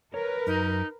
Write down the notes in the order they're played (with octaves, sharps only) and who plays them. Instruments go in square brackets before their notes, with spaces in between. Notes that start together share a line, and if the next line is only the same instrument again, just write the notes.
[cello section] A#4 B4 [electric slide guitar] C#5
[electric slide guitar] F#2 [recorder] D#4